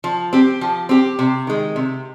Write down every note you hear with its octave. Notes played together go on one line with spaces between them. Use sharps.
F3
C4 G4
F3
C4 G4
C3
D#3 G#3
C3